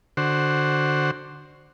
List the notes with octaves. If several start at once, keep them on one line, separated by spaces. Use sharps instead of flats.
D3 F#4 C5